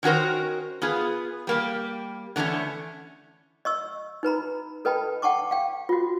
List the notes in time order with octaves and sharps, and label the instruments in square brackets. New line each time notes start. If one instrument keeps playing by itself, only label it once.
[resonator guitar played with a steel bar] D#3 C#4 F#4 A#4 C5
B3 F4 G#4
G3 A#3 G4
D3 E3 A3 A#3 C#4
[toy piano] D#5 C#6 E6
D#4 B4 A#5 B5
A4 B4 D#5 G5 A5 B5
F#5 G5 A5 C#6 D6
F5 G5
F4 F#4